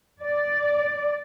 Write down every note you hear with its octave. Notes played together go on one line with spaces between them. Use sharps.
D5